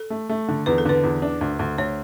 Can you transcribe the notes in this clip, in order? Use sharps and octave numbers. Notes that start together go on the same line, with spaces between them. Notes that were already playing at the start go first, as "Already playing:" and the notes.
Already playing: A4
A3
A3
D3
E2 B4
A4
D3 B4
E2
D4
D2
D2
D2 C#5